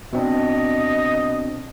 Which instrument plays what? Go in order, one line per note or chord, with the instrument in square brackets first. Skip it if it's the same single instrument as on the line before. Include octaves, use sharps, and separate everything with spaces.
[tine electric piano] B2 C4 D4 [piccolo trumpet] D#5